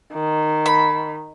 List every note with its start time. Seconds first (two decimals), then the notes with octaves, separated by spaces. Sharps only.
0.13 D#3
0.66 B5